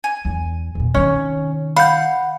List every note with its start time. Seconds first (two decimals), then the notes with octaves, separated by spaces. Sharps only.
0.04 G#5
0.25 E2
0.75 E2 A#2
0.94 C3 D#3 C#4
1.76 F5 F#5 B5 G6